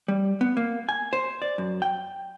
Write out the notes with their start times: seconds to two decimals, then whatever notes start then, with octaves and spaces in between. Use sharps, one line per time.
0.08 G3
0.41 B3
0.57 A#3
0.89 G#5
1.13 C5
1.42 D5
1.58 F#2
1.82 G5